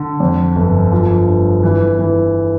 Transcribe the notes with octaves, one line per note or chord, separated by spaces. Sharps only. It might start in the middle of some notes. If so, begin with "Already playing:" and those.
Already playing: D3
F2
G1
F3
G2
E3
E3